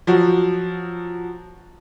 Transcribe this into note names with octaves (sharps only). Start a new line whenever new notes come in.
F3 F#3 F#4